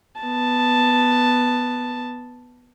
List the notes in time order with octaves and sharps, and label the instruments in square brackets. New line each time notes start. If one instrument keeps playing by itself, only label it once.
[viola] B3 A5